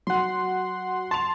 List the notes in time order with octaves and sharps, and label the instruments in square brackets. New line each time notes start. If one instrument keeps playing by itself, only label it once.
[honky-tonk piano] F#3 [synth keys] F#5 C6
[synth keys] A5 [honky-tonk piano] C6 F7